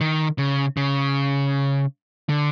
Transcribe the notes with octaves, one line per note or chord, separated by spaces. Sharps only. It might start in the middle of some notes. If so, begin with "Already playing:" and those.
D#3
C#3
C#3
D3